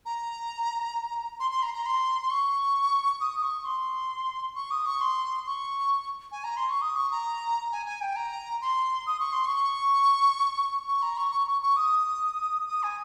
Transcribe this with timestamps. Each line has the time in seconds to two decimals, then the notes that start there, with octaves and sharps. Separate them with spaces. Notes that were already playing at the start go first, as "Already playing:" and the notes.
0.06 A#5
1.40 C6
1.51 C6
1.63 A#5
1.74 A#5
1.86 C6
2.22 C6
2.31 C#6
3.20 D#6
3.43 C#6
3.65 C6
4.55 C#6
4.71 D#6
4.86 C#6
5.01 C6
5.46 C#6
6.32 G#5
6.44 A#5
6.57 C6
6.70 C#6
6.82 D#6
6.96 C#6
7.11 A#5
7.72 G#5
7.86 G#5
8.01 G5
8.16 A#5
8.61 C6
9.07 D#6
9.20 C#6
9.33 C6
9.45 C#6
10.88 C#6
11.02 A#5
11.18 C#6
11.32 C#6
11.47 C#6
11.62 C#6
11.77 D#6
12.67 D#6
12.83 G#5